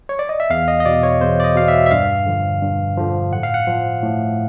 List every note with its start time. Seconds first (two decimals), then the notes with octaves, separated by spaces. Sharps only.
0.09 C#5
0.19 D5
0.29 D#5
0.40 E5
0.50 E2 F5
0.68 D#5
0.80 D#5
0.85 B2 D5
1.03 C#5
1.21 E2 C5
1.40 D5
1.44 D#5
1.56 B2 F5
1.68 E5
1.86 E5
1.91 G2 F5
2.26 D3 F3
2.62 G2
2.98 D3 F3
3.32 A2 F#5
3.43 F5
3.54 F#5
3.67 F3
4.03 A2